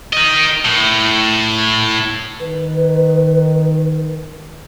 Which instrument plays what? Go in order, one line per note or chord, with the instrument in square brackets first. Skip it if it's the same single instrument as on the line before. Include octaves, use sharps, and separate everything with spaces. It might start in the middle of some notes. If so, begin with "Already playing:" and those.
[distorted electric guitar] A#4 D#5
A2
[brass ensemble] D#3 [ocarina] B4